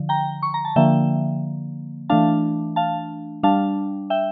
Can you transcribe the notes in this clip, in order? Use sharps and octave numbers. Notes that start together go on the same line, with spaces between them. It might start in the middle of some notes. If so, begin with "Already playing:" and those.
Already playing: D3 F3
G5 A#5
C#6
A#5
A5
D3 F3 A#3 E5 G5
E3 A3 D4 F5 A5
F5 A5
G3 D4 F5 A5
E5 G5